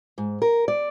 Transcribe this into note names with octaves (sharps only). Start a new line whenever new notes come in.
G#2
A#4
D5